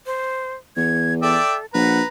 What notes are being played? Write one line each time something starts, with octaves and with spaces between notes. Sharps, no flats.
C5
E2 G#6
A4 D5 E5 G5
A#1 B4 F#5 A#5